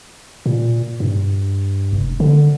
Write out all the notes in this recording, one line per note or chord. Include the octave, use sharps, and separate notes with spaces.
A#2
G2
F1
D3